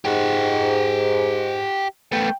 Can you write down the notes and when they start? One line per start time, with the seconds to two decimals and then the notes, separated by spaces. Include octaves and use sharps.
0.05 G#2 G4 F#5
2.12 A3 B3 G5